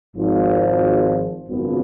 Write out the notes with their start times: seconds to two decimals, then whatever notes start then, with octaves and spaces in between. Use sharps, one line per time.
0.16 G#1 G#2 F3
1.48 G#1 F#2 C#3 F3 B3